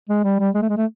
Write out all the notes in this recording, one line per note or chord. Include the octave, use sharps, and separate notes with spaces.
G#3
G3
G3
G#3
A3
G#3
A3